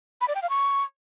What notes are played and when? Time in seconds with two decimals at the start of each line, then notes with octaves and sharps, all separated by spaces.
0.21 B5
0.28 D5
0.35 G5
0.42 F5
0.49 C#6